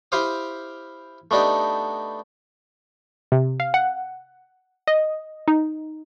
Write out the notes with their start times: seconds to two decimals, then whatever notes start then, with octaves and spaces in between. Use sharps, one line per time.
0.12 E4 G4 C5 F5 D#6
1.31 A3 B3 D4 D#4 G4
3.32 C3
3.60 F5
3.74 F#5
4.87 D#5
5.48 D#4